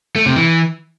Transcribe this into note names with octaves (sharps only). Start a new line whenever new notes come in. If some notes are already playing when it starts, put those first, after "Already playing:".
A3
C3
E3